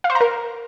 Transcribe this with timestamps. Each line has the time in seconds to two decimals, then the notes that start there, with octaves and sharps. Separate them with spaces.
0.04 F5
0.10 C5
0.15 A#5
0.21 A#4